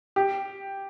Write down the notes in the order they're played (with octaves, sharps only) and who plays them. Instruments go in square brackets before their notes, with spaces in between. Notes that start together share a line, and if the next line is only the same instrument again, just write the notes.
[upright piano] G4